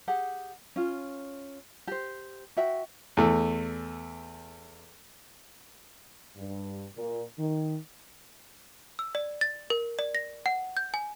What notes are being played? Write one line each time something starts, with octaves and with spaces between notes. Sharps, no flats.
G4 G#4 F#5
C#4 F4
G4 C5
F#4 E5 G5
E2 A3
G2
A#2
D#3
E6
D5
A6
A#4
D5
A#6
F#5
G6
G#5